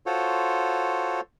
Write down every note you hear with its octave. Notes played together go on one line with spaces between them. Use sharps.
F4 F#4 A4 C5 C#5